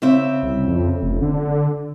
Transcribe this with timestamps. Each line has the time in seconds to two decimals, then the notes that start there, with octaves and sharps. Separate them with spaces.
0.02 C#3 C4 E5
0.43 C2
0.68 F2
1.03 F1
1.22 D3